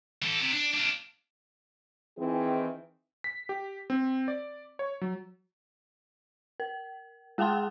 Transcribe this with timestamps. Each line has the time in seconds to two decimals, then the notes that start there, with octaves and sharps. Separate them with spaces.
0.22 E3 A4
0.40 C3
0.53 D4
0.74 D4 F4
2.18 D#3 E3 C4 E4 G#4
3.24 B6
3.49 G4
3.90 C4
4.28 D5
4.79 C#5
5.01 F#3
6.60 A#4
7.38 G#3 G#4 F#5 G5 A5 C6